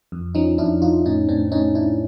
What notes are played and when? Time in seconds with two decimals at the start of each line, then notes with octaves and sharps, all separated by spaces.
0.12 F2
0.35 F3 C#4 D#4
0.58 F2 D4 E4
0.82 F2 D#4 F4
1.06 A2 C#4 D#4
1.29 A2 C4 D4
1.52 A2 C#4 D#4
1.75 A2 D4 E4